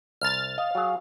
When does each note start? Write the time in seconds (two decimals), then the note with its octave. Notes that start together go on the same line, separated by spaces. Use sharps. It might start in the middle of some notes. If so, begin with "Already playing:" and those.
0.21 C2 F6 A6
0.58 D#5 F5
0.75 F#3 G#4